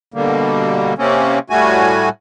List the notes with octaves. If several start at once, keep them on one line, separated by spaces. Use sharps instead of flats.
B2 D3 G3 A#3
C3 A#3 C4 C#4
A2 G3 A3 F#4 G#5